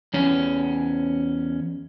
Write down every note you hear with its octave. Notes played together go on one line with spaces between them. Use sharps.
E2 C#4